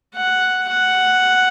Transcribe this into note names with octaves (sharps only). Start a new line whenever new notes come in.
F#5
F#5